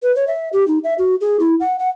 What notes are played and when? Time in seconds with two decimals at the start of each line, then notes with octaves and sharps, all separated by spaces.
0.03 B4
0.16 C#5
0.27 E5
0.53 G4
0.68 D#4
0.84 E5
0.98 F#4
1.21 G#4
1.39 E4
1.60 F#5
1.79 F#5